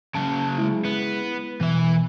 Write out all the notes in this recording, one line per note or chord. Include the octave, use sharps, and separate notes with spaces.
C#3 F#3 A5
G#3 E4
B3
B2 E3 E5